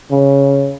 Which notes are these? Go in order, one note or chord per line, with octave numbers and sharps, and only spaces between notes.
C#3